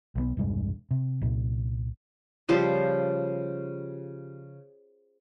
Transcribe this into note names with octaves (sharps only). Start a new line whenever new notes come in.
B1 F3 B3
E1 C2 G2 G#3
C3
C2 A#2
C#3 F3 G3 C5